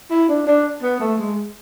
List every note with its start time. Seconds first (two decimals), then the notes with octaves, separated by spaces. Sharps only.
0.10 E4
0.28 D4
0.47 D4
0.82 B3
1.00 A3
1.18 G#3